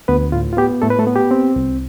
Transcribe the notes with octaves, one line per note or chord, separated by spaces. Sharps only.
D2 B3 B4
A2 F4
F4
B3 G4
A2 A3 A4
B4
A3 A4
B3
G4
C4
C2